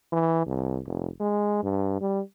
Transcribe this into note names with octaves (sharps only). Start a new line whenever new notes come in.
E3
C2
F1
G#3
G2
G3